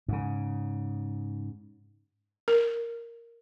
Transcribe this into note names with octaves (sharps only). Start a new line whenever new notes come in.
G#2 C#3
A#4